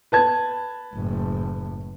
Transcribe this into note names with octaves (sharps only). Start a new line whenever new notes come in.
B4 A5 G#6
F#1 A2